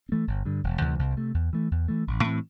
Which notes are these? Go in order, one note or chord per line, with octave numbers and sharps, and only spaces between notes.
C4
E3 A3
G1
G2 D3
E1
D2 C3 E3
C2
C3 A3
E2
E3 A3
E2
E3 A3
A1
A2 E3 C4